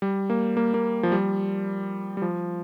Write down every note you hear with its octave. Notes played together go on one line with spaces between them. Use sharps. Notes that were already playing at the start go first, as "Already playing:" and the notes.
G3
A#3
A#3
A#3
F3
G3
G3
F3